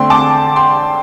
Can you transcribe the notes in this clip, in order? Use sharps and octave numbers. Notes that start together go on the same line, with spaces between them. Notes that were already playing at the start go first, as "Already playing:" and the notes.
Already playing: D3 A3 C4 G5 C6
A5 D6
G5 C6